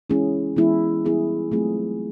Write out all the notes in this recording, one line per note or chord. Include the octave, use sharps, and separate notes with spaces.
E3 G#3 C#4 E4 G#4
E3 G#3 B3 E4 G#4
G3 B3 E4 G#4
F#3 A3 C4 F4 G#4